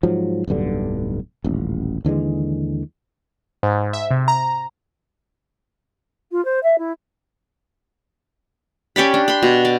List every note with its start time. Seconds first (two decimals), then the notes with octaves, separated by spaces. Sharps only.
0.03 G#2 F3 F#3
0.48 D1 B1 G2 D3
1.44 D#1 A1
2.05 D#2 D3 E3 G#3
3.63 G#2
3.93 E5
4.11 C3
4.28 A#5
6.32 F4
6.45 C5
6.63 E5
6.79 E4
8.96 C#4 G4 D5 B5
9.14 D4
9.28 B5 C6
9.43 B2
9.65 D5